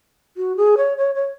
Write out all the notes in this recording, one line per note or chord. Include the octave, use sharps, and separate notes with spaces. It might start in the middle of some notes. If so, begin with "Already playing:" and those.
F#4
G#4
C#5
C#5
C#5